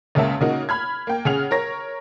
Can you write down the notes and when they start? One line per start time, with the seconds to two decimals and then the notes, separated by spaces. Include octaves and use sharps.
0.15 C#2 C#3 A#3 E5 A5
0.41 C#3 A#3 D#4 F#4
0.69 B5 F6 G#6
1.07 A#3 G5
1.25 C#3 G#4 F#5 F6 F7
1.51 A#4 C#5 A#6